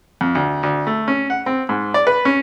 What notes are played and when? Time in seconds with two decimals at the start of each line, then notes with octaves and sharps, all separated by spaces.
0.21 F2
0.35 D2
0.63 D2
0.87 A3
1.08 C#4
1.30 F#5
1.46 C4
1.69 G#2
1.94 D5
2.07 B4
2.25 C#4